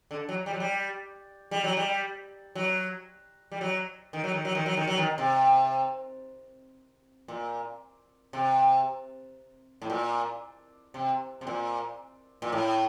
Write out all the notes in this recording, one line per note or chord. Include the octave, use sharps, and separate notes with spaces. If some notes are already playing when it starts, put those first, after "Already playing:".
D3
F#3
G3
F#3
G3
G3
F#3
G3
F#3
G3
F#3
D#3
F#3
D#3
F#3
D#3
F#3
D#3
F#3
D#3
C3
A#2
C3
A2
A#2
C3
C3
A#2
A#2
A2